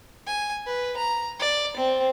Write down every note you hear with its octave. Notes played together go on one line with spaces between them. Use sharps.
G#5
B4
A#5
D5
C4